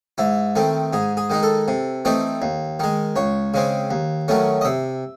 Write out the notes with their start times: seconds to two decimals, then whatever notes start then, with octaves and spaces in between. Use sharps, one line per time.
0.18 G#2 E4
0.56 D#3 A3 C4
0.93 G#2 G#4
1.17 G#4
1.30 D#3 G#3 D#4
1.43 A4
1.68 C3
2.05 E3 A3 C4 D#4
2.42 D#2
2.80 D#3 G#3
3.16 C#2 C#5
3.54 C#3 G#3 C4
3.91 D#2
4.28 D#3 F#3 A3 C#4
4.61 D#5
4.65 C3 E5